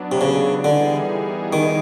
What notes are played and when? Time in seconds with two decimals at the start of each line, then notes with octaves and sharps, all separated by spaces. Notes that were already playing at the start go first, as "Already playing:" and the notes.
Already playing: F#3 B3 D4
0.12 C3
0.21 C#3
0.64 D3 E3 G3 B3 D#4 G#4
1.53 D#3